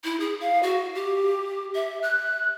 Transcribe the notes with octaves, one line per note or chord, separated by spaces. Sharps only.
E4
G#4
F5
F#4
G4
E5
F#6